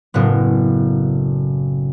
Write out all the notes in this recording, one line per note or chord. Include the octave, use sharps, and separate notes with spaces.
F#1 A2 B3